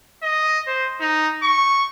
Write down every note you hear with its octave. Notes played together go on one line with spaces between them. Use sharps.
D#5
C5
D#4
C#6